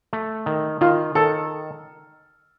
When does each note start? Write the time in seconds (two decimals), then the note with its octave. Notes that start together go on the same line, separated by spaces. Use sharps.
0.13 A3
0.46 D#3
0.81 D#3 F4
1.15 D#3 A4